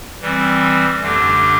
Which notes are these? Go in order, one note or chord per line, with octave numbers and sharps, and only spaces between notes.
E3 G3 C4
F#2 D3 A3 D4 G4